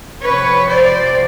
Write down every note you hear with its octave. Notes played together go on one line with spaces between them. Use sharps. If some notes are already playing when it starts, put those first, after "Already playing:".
F2 C3 F3 B4 C#5
C5 D5